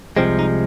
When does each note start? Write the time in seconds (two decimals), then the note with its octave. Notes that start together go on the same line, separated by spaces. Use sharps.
0.17 C2 C3 F3 G#3 C4
0.39 D#4